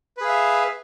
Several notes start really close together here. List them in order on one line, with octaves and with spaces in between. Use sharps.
B4 G#4 F5 E5